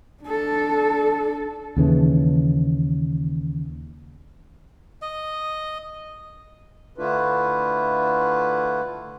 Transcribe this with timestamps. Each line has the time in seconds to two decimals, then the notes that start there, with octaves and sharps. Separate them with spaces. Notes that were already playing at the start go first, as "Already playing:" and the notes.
0.24 D4 A4
1.77 D#2 C#3 E3
5.02 D#5
6.98 D3 A3 D4 E4 F4 B4